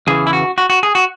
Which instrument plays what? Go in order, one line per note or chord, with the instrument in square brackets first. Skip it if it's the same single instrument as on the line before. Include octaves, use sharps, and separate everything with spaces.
[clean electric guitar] E2 C#3 E3 G#4
E4
F#4
F#4
F#4
G#4
F#4